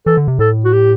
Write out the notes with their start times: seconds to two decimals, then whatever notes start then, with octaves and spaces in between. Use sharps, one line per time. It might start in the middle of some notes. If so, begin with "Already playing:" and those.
0.06 E3 A4
0.17 D3
0.28 C3
0.39 A2 A4
0.65 F#4
0.73 G4